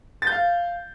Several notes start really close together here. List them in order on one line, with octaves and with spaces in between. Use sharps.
A6 G6 F5